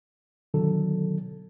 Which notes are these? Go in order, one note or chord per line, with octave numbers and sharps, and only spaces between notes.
B2 D3 D#3 F#3 A4